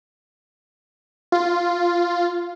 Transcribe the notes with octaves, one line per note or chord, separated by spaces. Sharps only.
F4